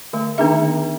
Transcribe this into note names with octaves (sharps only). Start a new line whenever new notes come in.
D3 A3
D#3 B3 D4 D#4 G#4 E5